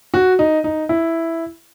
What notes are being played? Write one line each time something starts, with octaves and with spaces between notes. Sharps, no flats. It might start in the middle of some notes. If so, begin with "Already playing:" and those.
F#4
D#4
D#4
E4